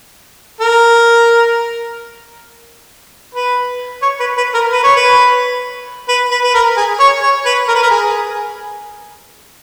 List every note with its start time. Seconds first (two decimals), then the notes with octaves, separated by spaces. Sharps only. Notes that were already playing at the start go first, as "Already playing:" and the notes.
0.61 A#4
3.35 B4
4.02 C#5
4.20 B4
4.37 B4
4.54 A#4
4.72 B4
4.84 C#5
4.96 B4
6.09 B4
6.31 B4
6.43 B4
6.54 A#4
6.77 G#4
7.00 C#5
7.22 C#5
7.46 B4
7.68 A#4
7.75 B4
7.83 A#4
7.90 G#4